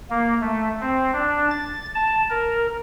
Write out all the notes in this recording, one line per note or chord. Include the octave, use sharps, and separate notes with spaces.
A#3
A3
C4
D4
A6
A5
A#4